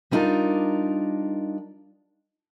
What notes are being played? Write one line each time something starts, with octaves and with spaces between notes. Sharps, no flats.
G3 B3 D4 D#4 F4 A#4